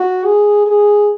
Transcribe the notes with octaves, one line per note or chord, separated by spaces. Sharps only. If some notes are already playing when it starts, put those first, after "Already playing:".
Already playing: F#4
G#4
G#4